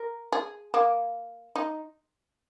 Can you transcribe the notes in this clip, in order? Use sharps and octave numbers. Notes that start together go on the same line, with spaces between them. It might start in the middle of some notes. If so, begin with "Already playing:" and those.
Already playing: A#4
G#4
A#3
D#4